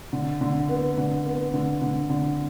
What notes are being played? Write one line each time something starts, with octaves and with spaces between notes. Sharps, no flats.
D3
D3
B3
D3
B3
D3
D3
D3